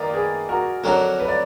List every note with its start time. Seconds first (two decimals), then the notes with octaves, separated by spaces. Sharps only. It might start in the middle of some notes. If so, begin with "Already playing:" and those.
Already playing: D#3 A#3 D#4 A#4 B4 D5 D#5 F5
0.13 G#4 B4
0.49 F#4 A#4
0.84 F2 D3 F#3 D4 F#4 A#4
1.20 B4
1.28 D5